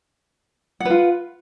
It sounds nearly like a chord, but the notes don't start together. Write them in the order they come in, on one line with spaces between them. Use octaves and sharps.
F#5 B4 F4